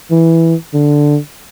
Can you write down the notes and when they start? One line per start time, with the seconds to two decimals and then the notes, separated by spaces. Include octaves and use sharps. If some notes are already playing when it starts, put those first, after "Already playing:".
0.11 E3
0.74 D3